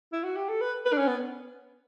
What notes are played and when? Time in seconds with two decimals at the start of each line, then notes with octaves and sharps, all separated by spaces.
0.13 E4
0.23 F#4
0.36 G4
0.49 A4
0.61 B4
0.86 B4
0.93 D4
0.98 C#4
1.08 B3